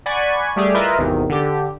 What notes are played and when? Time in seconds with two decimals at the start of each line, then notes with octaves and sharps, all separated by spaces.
0.06 D5 F#5 G#5 B5 C#6 G#6
0.56 G3 A3 G4 G#4
0.74 E4 F4 A#4 B4 D#5 E5
0.99 G#1 E2 C3 D#3
1.29 D3 G4